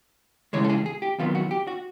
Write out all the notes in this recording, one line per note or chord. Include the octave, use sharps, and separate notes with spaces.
F2 C#3 E3 G#3 C#5
A4
G#4
G#4
G4
E2 C3 D#3 F#3 B3 F4
F#4
G4
F#4